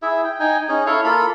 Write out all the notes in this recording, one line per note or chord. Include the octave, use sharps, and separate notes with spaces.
E4 G#4 E5
G5
D#4 G5 G#5
C#4 D#4 G#4
E4 A4 C#5 F5
A#3 F4 A4 B5